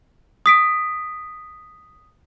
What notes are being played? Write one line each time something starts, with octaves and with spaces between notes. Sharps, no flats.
D#6 B6 D7